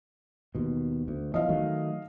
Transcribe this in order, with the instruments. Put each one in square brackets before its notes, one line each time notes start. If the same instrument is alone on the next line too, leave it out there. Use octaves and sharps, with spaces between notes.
[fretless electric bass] D#2 B2
D2
[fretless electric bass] E2 E3 F3 [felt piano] D#5 F5
[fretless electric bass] D#3 F#3 A3